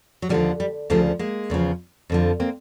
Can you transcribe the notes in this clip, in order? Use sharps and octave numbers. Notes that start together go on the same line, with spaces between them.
F#3
D#2 D3 F3 G3
G3
D2 C#3 F3 G3 A3
G#3 A#3
E2 C#3 F3
F2 D3 F3
A#3 C4